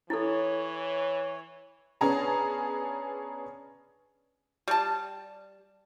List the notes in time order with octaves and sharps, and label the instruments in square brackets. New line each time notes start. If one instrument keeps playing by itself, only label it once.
[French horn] E3 [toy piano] E4 A4 [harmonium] C#5
[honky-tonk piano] B3 C#4 D4 G#4 A5 A#5
[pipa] G3 A5